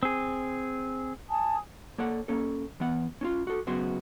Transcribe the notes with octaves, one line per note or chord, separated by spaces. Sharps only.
C4 G#4
G#5 A5 D#6
A#3 A4 C#5 D5 F#5
A#3 C#4 A4
E3 B3 F#5
C#4 D4 F4
F#4 A4
F#2 C#3 B3 F#4 G#4 C6